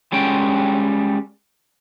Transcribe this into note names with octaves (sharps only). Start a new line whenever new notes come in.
G3 G#3 C#4 G5